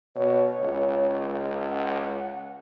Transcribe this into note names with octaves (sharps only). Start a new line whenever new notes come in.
B2 C#5
C#2
F#5